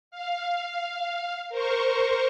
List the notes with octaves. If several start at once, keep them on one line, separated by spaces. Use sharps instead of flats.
F5
A#4 C5 C#6